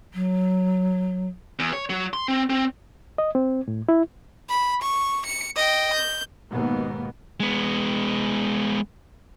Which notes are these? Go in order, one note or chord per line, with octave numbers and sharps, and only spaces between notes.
F#3
E2
C#5
F#3
C6
C4
C4
D#5
C4
A2
E4
B5
C#6
C#7
D#5 G5
G6
D#2 G#2 B2 A#3 B3
G#3 B3